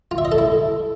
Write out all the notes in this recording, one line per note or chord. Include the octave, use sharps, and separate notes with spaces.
F4
E5
D#5
A4
E4